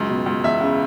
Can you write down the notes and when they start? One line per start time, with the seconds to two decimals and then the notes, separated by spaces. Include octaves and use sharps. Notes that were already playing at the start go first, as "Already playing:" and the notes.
Already playing: C#2 F#2
0.09 B2
0.26 C#2
0.44 E2 E5
0.61 C#3